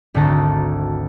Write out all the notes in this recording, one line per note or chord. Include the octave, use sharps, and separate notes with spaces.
G#1 D2 D3 D#4 A5 A#5